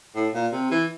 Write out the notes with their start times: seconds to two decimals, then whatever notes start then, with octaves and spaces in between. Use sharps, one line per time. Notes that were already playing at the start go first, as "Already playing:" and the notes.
0.15 A2
0.34 A#2
0.53 C3
0.71 E3